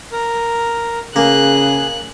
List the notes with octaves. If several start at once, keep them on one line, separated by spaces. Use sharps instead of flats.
A#4
C#3 A#3 G#4 F#6